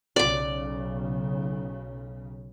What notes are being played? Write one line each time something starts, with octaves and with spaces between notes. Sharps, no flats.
B1 C#3 D5 D6